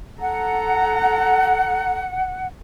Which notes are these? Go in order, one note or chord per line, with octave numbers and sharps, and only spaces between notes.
A4 F#5 A#5